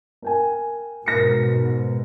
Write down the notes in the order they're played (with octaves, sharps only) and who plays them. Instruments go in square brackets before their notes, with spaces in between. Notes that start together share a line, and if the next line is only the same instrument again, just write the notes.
[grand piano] A#4 G5 G#5
[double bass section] G#2 B2 [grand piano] A#4 A#6 C#7